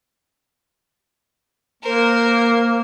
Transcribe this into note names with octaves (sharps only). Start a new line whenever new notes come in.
A#3 A#4 C5